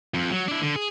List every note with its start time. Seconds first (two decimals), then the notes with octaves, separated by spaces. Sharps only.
0.14 F2
0.31 F#3
0.48 D4 E4
0.62 D3
0.76 G#4